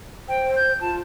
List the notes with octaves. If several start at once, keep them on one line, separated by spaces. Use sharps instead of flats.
C5 G5
G6
F4 A5